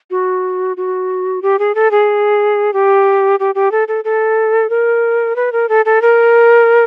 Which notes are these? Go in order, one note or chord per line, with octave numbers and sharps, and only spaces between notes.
F#4
F#4
G4
G#4
A4
G#4
G4
G4
G4
A4
A4
A4
A#4
B4
A#4
A4
A4
A#4